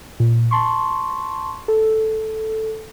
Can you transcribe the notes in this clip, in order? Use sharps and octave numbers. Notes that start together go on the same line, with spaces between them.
A#2
A5 C6 C#6
A4